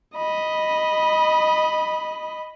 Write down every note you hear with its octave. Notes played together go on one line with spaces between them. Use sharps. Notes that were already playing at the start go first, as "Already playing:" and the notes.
D#5 B5